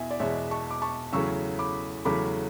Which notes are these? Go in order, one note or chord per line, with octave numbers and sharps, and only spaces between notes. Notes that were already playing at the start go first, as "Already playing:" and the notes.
Already playing: E2 B2 E5 G#5
D5
E2 B2 G#3 C#5 E5
A5 C#6
D6
A5 C#6
E2 C#3 F#3 A3 C#6 E6
B5 D6
E2 C#3 F#3 A3 B5 D6